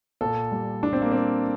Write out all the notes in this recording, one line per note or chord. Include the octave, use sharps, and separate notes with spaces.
A#2 A4
G3
A#2 D4
C4
A#3
G3 C4